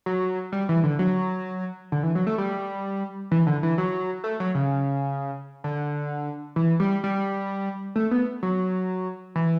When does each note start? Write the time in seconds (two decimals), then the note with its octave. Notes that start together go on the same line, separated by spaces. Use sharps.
0.06 F#3
0.52 G3
0.69 E3
0.84 D3
0.99 F#3
1.92 D3
2.03 E3
2.15 F#3
2.27 A3
2.38 G3
3.31 E3
3.47 D3
3.63 E3
3.78 F#3
4.24 A3
4.40 F#3
4.55 C#3
5.64 D3
6.56 E3
6.80 G3
7.04 G3
7.96 A3
8.11 B3
8.43 F#3
9.36 E3